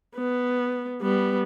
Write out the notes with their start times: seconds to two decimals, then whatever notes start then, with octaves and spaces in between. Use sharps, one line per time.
0.15 B3
1.02 G3 B3